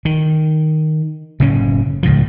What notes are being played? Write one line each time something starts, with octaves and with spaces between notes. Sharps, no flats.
D#3
F#1 A2 C#3 C#4
C#2 A2 F3